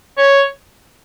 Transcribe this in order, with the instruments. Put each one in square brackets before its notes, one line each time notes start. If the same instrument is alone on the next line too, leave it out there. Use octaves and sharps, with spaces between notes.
[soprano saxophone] C#5